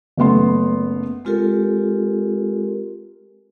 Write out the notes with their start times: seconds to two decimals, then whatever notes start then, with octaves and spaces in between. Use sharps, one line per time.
0.17 F#1 A3 B3 C6
1.25 G#3 C4 F4 G4 A4 A#4